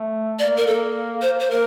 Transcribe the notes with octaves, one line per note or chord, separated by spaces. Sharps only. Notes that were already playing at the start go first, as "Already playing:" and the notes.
Already playing: A3
A#3 D5
A#4
A#3 A4
C5
C5
A#3 A#4